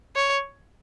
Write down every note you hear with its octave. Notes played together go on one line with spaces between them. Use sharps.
C#5